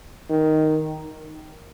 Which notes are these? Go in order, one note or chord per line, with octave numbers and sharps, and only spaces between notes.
D#3